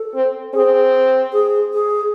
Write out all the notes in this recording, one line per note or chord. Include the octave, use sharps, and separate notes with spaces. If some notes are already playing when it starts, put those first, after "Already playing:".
Already playing: A4
C4
C4 G#4
G#4
G#4